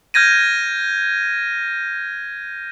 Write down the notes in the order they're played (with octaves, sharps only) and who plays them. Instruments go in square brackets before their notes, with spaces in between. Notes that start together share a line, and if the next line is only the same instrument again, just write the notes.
[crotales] F6 G6 G#6 A#6 D#7